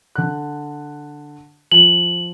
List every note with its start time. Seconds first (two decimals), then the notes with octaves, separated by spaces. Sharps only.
0.16 D3 F#6
1.72 F3 F#7